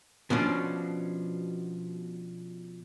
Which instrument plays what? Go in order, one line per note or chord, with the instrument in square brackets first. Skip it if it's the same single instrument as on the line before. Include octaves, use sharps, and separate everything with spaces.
[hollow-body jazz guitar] B2 F3 C#4 D4